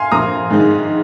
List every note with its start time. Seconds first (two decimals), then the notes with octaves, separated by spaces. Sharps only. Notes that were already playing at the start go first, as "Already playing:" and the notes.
Already playing: F5 G#5 C6
0.12 A#1 A#5 D#6
0.50 G#2 D#3 G#3 D#4